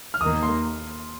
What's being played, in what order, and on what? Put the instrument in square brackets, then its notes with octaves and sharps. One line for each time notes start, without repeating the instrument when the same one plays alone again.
[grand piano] F6
[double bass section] D#2 D#3 A#3 [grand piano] D#6
[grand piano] C6